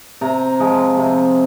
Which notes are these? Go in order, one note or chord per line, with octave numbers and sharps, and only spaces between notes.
C3 A#5
F3 G#3
C3